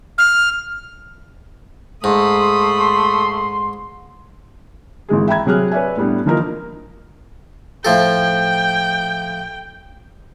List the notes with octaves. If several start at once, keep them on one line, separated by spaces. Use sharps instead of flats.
F6
G#2 A3 B5 C6 D#6
G#1 E3 G#3 G#4
E5 G5 A#5 B5 G#6
C3 F#3 G#4 F6 F#6
B4 C#5 D5 E5 G#5
A2 G3 B3 D4
E3 F3 A#3 D#4 A#4
A2 F3 A4 G5